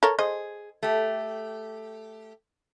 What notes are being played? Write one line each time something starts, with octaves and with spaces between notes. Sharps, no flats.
A4 A#4 C#5
G#4 C5 D#5
A3 G4